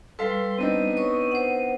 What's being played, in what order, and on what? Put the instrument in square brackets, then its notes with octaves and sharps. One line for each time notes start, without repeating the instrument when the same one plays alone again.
[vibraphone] G3 B4 [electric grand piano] A4 F5 [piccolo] C6
[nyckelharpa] B3 [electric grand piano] C4 D4 D#4 [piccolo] D#7
[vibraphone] C#5 C#6 D#6 [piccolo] D#7
[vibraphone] C5 F#5